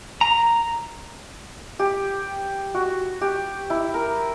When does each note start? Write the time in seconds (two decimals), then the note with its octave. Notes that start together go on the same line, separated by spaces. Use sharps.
0.21 A#5
1.79 G4
2.75 F#4
3.21 G4
3.70 E4
3.94 A#4